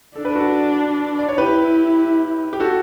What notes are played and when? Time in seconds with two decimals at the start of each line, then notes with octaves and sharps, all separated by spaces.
0.16 D4 A4
0.25 B4
0.35 F#4 A4
1.19 D5
1.29 C#5
1.37 E4 G4 B4
2.53 G4
2.60 F#4 A4